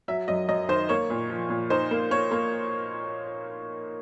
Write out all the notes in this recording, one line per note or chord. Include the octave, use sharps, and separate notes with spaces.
F#3 E5
F#2 D#5
F#2 D#5
D#3 C5
A#3 C#5
A#2
F3
A#2
D#4 C5
A#3
A#3 C#5
A#3